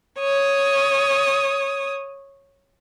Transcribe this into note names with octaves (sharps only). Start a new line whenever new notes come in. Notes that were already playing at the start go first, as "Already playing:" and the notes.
C#5 D#6